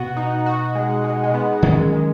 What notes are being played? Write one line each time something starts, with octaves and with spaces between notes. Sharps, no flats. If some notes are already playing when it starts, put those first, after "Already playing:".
Already playing: B2 B3 F#4
D#4
F#4
G#3
G#3
G#3
B3
D#3 F#3 G#3 C#4
G#3